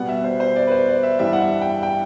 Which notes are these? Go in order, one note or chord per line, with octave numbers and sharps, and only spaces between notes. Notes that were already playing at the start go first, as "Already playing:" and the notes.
Already playing: B2 G3 B3 F#5
E5
C5
C5
D5
B4
C5
D5
E5
G2 E3 G3 E5
F#5
E5
G5
G5